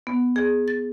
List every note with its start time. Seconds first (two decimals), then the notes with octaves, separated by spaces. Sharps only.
0.07 B3
0.36 G#4
0.68 A6